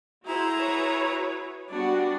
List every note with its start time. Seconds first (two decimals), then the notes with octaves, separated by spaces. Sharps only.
0.24 E4 F#4 G#4 C5 A#5
0.55 F#4 B4 C#5
1.70 G3 B3 D4 F#4